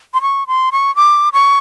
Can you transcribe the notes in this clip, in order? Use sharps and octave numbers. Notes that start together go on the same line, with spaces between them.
C6
C#6
C6
C#6
D6
C#6